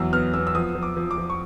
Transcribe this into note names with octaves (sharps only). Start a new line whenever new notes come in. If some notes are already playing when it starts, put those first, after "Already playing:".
Already playing: E2 F#3 E6
B3 F6
B3 E6
E6
F3 D#6
F3
D6
F3
D6
F3
C#6